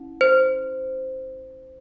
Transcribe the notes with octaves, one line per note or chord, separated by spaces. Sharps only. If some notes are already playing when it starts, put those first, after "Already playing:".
Already playing: C#4 E4
C5